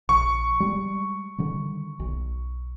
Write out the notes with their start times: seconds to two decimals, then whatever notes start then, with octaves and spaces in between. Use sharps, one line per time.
0.09 A#1 C#6
0.60 G3 G#3
1.38 D3 D#3 G3
2.00 B1